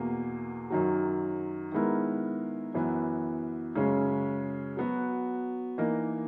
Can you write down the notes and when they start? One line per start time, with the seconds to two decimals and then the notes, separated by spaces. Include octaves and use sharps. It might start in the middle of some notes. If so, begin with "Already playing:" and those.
Already playing: E2 B2 A#3
0.70 F#2 D#3 F#3
1.72 D#3 G#3 B3 E4 A#4
2.74 F#2 E3 B3
3.75 F#2 C#3 G#3 C#4
4.77 F#3 B3 F#4
5.78 E3 A#3 D#4 A#4